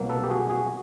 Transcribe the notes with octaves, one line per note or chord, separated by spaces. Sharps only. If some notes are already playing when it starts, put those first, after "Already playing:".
Already playing: C2 B2 F#3 A#3
A4 B4
G4
F#4 G#4
F#4 G#4